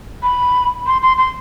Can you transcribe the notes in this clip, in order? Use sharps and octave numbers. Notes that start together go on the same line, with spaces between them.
B5
C6
C6
C6